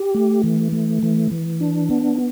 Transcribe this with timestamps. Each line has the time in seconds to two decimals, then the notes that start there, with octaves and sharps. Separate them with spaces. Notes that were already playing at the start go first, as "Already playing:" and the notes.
Already playing: G4
0.15 A3
0.44 E3
0.72 A3
1.03 E3
1.31 E3
1.61 D4
1.90 B3